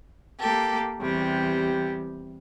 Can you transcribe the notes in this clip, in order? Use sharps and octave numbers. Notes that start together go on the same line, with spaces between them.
A#3 G4 A4
E2 C3 G3